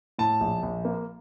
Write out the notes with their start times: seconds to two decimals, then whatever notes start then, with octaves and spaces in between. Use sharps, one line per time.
0.19 A2 A5
0.41 A#1
0.63 A#1
0.85 A#3